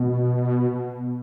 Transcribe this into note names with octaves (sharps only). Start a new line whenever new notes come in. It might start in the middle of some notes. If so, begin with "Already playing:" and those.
Already playing: B2